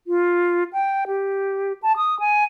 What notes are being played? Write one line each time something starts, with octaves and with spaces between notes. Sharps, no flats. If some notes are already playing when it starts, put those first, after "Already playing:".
F4
G5
G4
A5
D#6
G#5